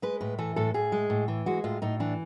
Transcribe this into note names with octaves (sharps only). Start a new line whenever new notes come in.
G#3 B4
A2 B4
E3 A4
A2 A4
A2 G#4
G#3
A2
E3
G#3 F#4
A2 F4
A2 D#4
E3 D4